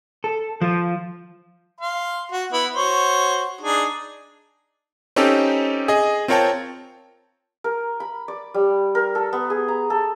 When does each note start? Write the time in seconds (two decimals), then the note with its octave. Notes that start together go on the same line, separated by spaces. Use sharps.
0.24 A4
0.61 F3
1.81 F5 C6
2.32 F#4
2.53 B3 E4
2.76 F#4 C5 C#5
3.61 D4 D#4 G#4
5.16 C4 C#4 D#4 G4 A4
5.88 G#4 D#5
6.28 C4 F4 A#4 C#5 G5 A5
7.64 A#4
8.00 B5
8.28 D5
8.54 G3
8.95 A#4
9.15 A4
9.33 B3
9.50 G#4
9.68 A#5
9.90 A4